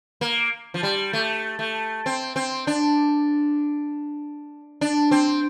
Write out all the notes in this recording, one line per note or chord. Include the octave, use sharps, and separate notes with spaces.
A#3
F3
G3
A3
A3
C4
C4
D4
D4
C4